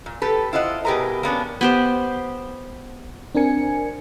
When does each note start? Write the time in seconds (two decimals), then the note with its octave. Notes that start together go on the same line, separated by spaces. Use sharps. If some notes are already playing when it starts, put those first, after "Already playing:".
0.06 A#2
0.22 G4 A4 B4
0.53 E4 F4 C5 D#5 F#5
0.85 B2 G4 G#4 A#4 B4 A#5
1.23 A#3 B3 C#4 D4
1.61 B3 G4 C5
3.35 C4 D4 A#4 G#5 C#7